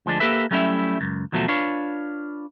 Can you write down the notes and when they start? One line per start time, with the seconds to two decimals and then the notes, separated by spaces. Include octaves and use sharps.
0.06 D2 F3 G#3 D4
0.20 A#3 G4 A4 B4 E5
0.51 F#3 G3 A3 C#4 E4 E5
1.01 C#2 F#2
1.32 D#2 B2 F3 F#3 A3
1.48 D4 F4 B4 C#5